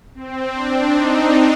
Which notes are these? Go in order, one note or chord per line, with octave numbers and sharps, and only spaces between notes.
C4
D4
D#4